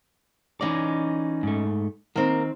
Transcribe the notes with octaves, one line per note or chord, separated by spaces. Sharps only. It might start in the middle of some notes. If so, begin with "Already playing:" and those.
E3 C#4 D#4 D5 D#5
G#2 A3
D#3 A#3 C4 A#4